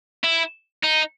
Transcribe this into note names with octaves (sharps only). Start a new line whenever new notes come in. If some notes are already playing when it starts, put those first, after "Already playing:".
E4
D#4